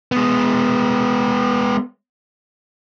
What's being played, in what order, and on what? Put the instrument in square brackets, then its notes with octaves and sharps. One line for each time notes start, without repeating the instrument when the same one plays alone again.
[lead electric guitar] G#3 B3